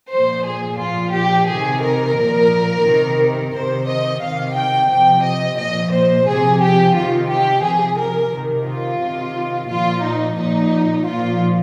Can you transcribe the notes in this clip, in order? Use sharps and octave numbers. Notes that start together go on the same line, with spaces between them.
A#2 F3 C5
G#4
A#2 F3 F4
G4
C3 D#3 G#4
A#4
A#2 F3
C3 D#3
C3 D#3 C5
D#5
C3 D#3 F5
G5
C3 F3 G5
D#5
A#2 F3 D#5
C5
C3 F3 G#4
G4
C3 D#3 F4
G4
C3 F3 G#4
A#4
C3 D#3
F4
C3 D#3
A#2 F3 F4
D#4
A#2 F3 D#4
A#2 F3 F4